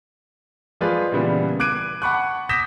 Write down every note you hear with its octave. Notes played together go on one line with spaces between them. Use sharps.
F3 G#3 F4 G#4 B4 D5
A#2 C#3 E3 G3 B3
D6 F#6 G#6 D7 D#7
F#5 A5 B5 C#6 D6 F#6
D6 D#6 G6 A#6 B6 E7